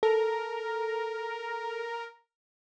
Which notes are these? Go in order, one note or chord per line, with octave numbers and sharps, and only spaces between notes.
A4 A#4